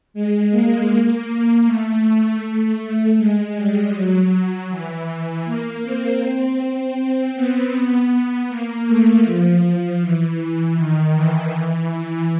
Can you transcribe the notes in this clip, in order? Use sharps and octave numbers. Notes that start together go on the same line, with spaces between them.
G#3
A#3
A3
A3
A3
A3
G#3
G3
F#3
E3
A#3
C4
C4
B3
A#3
A3
F3
E3
D#3
E3
E3